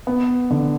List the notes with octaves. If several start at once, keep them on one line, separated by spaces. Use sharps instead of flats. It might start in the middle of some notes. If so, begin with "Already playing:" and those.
B3
D3